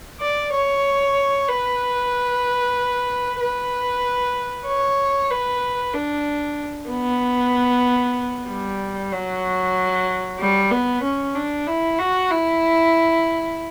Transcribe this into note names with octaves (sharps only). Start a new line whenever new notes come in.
D5
C#5
B4
B4
C#5
B4
D4
B3
G3
F#3
G3
B3
C#4
D4
E4
F#4
E4